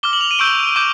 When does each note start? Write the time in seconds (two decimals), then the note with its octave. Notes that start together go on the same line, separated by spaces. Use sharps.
0.03 D6 F6 G7
0.13 F#7
0.21 F7
0.31 D#7
0.39 C#6 E6 G6 D7
0.76 D6 G6